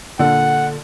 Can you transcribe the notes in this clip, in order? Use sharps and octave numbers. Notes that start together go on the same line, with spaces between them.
A#2 D3 F#5